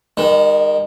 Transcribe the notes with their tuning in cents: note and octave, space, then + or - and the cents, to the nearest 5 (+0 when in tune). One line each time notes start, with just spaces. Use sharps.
D#3 +0 G#3 -40